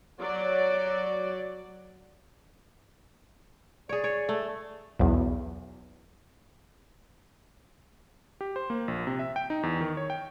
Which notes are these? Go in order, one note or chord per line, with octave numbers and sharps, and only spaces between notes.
F#3 D5
G#4 C#5 D5
C#5
A3
B1 E2
G4
C5
A#3
A#1
C3
E5
G5
D#4
E2
D#3
C#5
G5